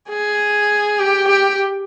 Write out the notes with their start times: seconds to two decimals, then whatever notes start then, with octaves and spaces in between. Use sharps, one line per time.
0.09 G#4
0.99 G4
1.28 G4